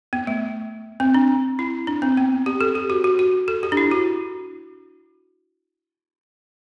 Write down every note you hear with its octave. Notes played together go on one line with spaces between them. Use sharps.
B3
A3
C4
D4
E4
D4
C4
B3
G4
A4
G4
F#4
F#4
F#4
A4
G4
D4
E4
F#4